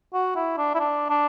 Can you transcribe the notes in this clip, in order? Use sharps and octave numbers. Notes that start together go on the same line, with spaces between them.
F#4
E4
D4
E4
D4
D4